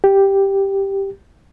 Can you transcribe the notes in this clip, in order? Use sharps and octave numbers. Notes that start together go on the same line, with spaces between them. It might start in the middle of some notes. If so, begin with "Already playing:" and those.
G4